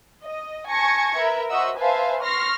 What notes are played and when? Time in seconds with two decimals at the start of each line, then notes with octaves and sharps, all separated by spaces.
0.25 D#5
0.69 G#5 A5 C#6 G#6 A#6 C#7
1.18 A#4 B4 E5
1.50 F#4 C5 D#5 E5 F#5 E6
1.79 B4 C5 E5 F5 G#5 A5
2.22 C6 C#6 F6 A#6 C7